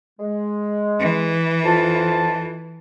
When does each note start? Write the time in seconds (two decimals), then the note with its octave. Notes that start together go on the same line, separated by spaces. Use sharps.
0.20 G#3
0.99 E3
1.64 F2 F4 A5